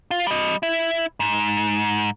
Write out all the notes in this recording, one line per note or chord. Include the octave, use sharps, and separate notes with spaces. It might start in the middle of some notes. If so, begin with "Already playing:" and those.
F4
G3 D#5
E4
G#2